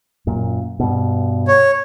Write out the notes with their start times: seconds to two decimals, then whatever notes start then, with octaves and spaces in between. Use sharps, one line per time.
0.27 F#2 A#2
0.80 G2 B2
1.48 C#5